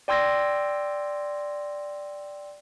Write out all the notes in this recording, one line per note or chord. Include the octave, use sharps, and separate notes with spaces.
D5 G5 C6 E6 G#6 A#6